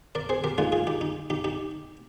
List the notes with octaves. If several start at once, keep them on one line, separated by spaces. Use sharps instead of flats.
A#4 D5
G#4 C5
G4 A#4
A#2 G#3 D#4 F4 G#4
F4 G#4
D#4 G4
D#4
D#4 G4
D#4 G4